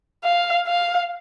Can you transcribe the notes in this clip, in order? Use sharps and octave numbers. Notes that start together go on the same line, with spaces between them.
F5
F5